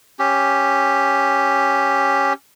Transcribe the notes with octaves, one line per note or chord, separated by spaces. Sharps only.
C#4 G4